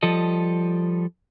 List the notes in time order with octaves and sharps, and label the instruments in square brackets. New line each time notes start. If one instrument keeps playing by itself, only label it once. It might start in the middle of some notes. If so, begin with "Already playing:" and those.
[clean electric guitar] F3 G3 A4 D#5